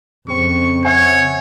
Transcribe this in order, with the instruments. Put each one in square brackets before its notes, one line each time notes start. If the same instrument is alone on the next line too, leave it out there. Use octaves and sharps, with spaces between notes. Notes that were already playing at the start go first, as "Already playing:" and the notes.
[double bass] F2 [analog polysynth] C#3 C4 [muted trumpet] C#6
[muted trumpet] C#5 [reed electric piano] E5 F#5 G#5